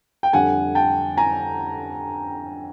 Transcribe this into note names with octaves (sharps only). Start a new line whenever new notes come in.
G5
F2 D3 G3 F#5 G#5
G5 A5
G#5 A#5